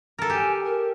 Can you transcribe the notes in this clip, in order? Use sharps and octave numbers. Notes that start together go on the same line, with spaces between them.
A4 A#4
G4 G#5
A#4